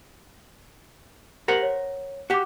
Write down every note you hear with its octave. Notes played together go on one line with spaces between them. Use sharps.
G4 A#4 C5 F#5 A#6 F#7
C#5
F#4 G4 F#5 D6